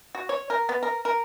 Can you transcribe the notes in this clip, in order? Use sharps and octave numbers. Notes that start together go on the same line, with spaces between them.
F#4
C#5
A#4
B3
A#4
A#4